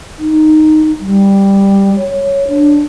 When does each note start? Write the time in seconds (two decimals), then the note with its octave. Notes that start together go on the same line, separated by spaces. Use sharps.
0.19 D#4
1.01 G3
1.96 C#5
2.48 D4